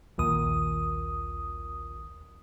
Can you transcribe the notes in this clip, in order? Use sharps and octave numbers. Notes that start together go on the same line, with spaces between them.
A#1 D#2 D#6